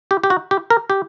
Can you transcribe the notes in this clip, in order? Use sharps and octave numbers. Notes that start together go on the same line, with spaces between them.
G4
G4
F#4
G4
A#4
G4